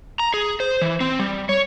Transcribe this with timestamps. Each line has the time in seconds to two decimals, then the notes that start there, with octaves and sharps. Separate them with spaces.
0.19 A#5
0.34 G#4
0.60 C5
0.82 E3
1.00 C4
1.19 G3
1.49 C#5